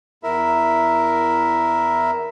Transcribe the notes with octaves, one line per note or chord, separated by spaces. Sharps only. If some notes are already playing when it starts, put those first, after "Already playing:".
E2 E4 A#4 E5